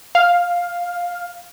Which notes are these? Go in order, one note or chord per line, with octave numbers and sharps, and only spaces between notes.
F5